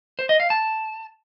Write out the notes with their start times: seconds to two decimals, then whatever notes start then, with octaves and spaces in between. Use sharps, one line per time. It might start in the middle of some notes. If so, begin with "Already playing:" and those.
0.19 C5
0.29 D#5
0.40 F5
0.50 A5